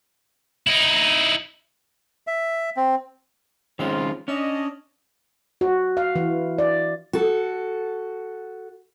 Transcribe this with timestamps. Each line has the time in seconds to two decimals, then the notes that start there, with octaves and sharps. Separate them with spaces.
0.67 D#4 E4
2.27 E5
2.77 C4
3.79 D#3 G#3 C4 C#4 F4
4.28 C#4 D4 D#5
5.61 F#4
5.97 F5
6.16 E3
6.58 D5
7.13 F#4 A4